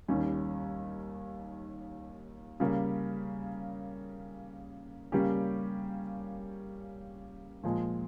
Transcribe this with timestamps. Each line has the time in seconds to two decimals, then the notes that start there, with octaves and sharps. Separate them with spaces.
0.08 D#2 D#3 G3 C#4
2.60 C#3 G3 A#3
5.12 C#3 G3 A#3 C#4 G4
7.64 A#2 F3 G#3